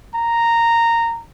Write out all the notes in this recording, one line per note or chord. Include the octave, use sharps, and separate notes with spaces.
A#5